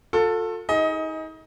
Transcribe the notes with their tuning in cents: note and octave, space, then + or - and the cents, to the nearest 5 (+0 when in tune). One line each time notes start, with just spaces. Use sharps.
F4 +45 A4 +15
D#4 +35 G#4 +0 D#5 +20